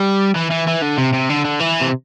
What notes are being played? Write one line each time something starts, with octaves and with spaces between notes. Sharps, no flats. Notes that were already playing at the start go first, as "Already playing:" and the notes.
Already playing: G3
E3
E3
E3
D3
C3
C3
D3
D3
E3
C3